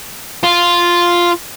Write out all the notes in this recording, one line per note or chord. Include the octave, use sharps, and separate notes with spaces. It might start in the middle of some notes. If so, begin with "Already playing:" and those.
F4